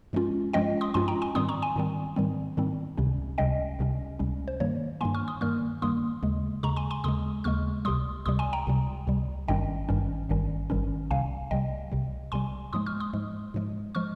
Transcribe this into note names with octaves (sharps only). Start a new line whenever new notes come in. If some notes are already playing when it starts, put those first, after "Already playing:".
G2 F3 G#3 C#4 F4
G2 F3 G#3 C#4 F4 D#5 G5
C6 D#6
G2 F3 G#3 C#4 F4 G#5 C6
G5 A#5
G#5 C6
G#2 D#3 G3 C4 C6 D#6
A#5 C#6
G#5 C6
G#2 D#3 G3 C4
G#2 D#3 G3 C4
G#2 D#3 G3 C4
C#2 C3 G3 C#4
C#2 C3 G3 C#4 D#5 G5
C#2 C3 G3 C#4
C#2 C3 G3 C#4
C5
G2 D#3 G3 A#3 C#5
G2 D#3 G3 A#3 G#5 C6
C#6 F6
C6 D#6
G2 D#3 G3 A#3 C#6 F6
G2 D#3 G3 A#3 C6 D#6
D#2 C#3 G#3
D#2 C#3 G#3 A#5 C#6
G#5 C6
G#5 C6
D#2 C#3 G#3 C6 D#6
D#2 C#3 G#3 C#6 F6
C#2 C3 G3 C6 D#6
C#2 C3 G3 C6 D#6
G#5 C6
G5 A#5
C#2 C3 G3
C#2 C3 G3
G#1 G2 D#3 G3 C#4 D#5 G5
G#1 G2 D#3 G3 C#4
G#1 G2 D#3 G3 C#4
G#1 G2 D#3 G3 C#4
C2 C3 G3 F5 G#5
C2 C3 G3 D#5 G5
C2 C3 G3
C2 C3 G3 G#5 C6
G#2 F3 G#3 C6 D#6
C#6 F6
C6 D#6
G#2 F3 G#3
G#2 F3 G#3
F3 G#3 C#6 F6